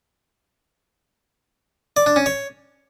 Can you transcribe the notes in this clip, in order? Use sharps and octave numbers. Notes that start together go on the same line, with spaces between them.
D5
D4
C#4
C#5